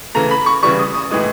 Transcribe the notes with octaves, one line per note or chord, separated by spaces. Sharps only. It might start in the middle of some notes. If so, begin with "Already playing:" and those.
C#3 E3 A3 A#5
B5
C#6
C#3 E3 G3 C#6
D#6
D#6
A2 E3 G#3 D#6